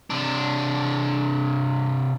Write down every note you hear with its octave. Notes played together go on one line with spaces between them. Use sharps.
C3 D4